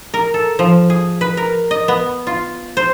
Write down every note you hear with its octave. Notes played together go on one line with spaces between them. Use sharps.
A#4
A4
F3
G#4
B4
A#4
D#5
B3
F4
C5